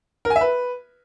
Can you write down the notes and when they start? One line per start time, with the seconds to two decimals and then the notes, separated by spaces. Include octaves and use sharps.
0.25 A#4
0.30 G#5
0.36 E5
0.41 B4